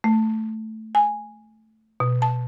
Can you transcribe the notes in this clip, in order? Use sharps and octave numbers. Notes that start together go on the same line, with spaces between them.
A3
G#5
B2
A5